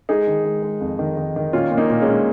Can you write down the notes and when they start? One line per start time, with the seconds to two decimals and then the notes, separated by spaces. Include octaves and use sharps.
0.09 G#3 D#4 G#4
0.27 D#3
0.45 G#3
0.63 G#3
0.81 F2
0.99 D#3
1.17 D#3
1.36 D#3
1.53 A#2 C#4 F4
1.71 A#2
1.77 A#3 D#4
1.90 A#2
2.01 G#3 C#4
2.08 A#2